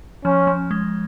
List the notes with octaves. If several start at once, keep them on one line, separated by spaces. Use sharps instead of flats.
F3 C#4
F3
G#3